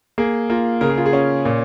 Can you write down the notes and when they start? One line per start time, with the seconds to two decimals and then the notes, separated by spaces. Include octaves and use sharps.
0.18 A#3 G#4
0.50 A#3 F4
0.81 C#3 A#4
0.89 G#4
0.97 F4
1.06 G#4
1.13 C#4
1.45 A#2